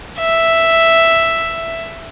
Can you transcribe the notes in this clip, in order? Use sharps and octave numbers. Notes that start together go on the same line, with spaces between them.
E5